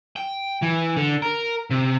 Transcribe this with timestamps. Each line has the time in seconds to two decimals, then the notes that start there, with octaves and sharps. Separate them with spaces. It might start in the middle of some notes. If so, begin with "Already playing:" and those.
0.16 G5
0.62 E3
0.97 D3
1.22 A#4
1.70 C3